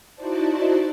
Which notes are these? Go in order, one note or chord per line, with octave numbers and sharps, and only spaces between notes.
D#4 E4 F#4 C5 D5 A5